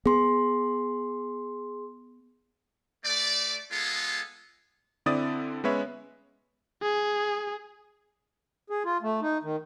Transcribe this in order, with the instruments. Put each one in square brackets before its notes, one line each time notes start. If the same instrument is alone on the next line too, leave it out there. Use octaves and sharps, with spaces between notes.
[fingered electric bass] B3 [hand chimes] G#4 C6
[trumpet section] A3 D5
G#3 B3 F4 G#4 A4
[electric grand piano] D3 C4 E4 D5 D#6 A6
G#3 B3 C#4 B4 C#5 E5
[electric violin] G#4
[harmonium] G#4
F4
A3
D#4
D#3